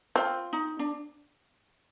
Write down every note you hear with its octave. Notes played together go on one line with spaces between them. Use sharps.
C4 F4
D#4
D4